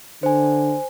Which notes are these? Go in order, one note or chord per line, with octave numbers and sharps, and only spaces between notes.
D3 C5 G#5